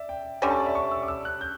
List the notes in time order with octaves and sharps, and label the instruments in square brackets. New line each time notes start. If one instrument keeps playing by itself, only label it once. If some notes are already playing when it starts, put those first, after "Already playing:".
Already playing: [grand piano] D5 E5
G5
[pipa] D3 G3 C#4 [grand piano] B5
[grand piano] A5
D5
E5
C#6
E6
D6
E6
F#6
G6